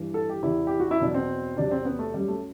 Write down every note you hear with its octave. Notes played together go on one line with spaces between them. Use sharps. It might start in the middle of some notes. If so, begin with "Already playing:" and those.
Already playing: G2 E3
A4
G4
E2 C3 E3 E4
G4
F#4
E4
E2 B2 F#3 D4
C4
E2 C3 F#3 D4
C4
B3
A3
F#2 F#3 G3
A3